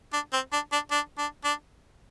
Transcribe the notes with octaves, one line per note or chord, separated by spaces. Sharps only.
D4
C4
D4
D4
D4
D4
D4